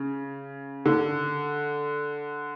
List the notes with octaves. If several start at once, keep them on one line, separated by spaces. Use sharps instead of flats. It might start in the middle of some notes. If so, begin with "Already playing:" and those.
Already playing: C#3
D3